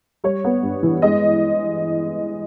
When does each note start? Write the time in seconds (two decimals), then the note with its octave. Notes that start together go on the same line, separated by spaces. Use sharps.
0.24 G3 C#5
0.44 B3
0.63 G2
0.83 E3
1.02 G#3 D#5